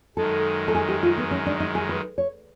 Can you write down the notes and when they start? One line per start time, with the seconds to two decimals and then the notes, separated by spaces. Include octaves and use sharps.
0.17 F#2 D#3 G#3 A4
0.68 A4
0.75 G#4
0.89 G4
1.03 F4
1.18 B3
1.31 C#4
1.46 D4
1.60 D#4
1.75 G#4
1.89 B4
2.18 C#5